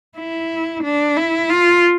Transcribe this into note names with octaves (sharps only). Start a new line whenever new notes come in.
E4
D4
E4
F4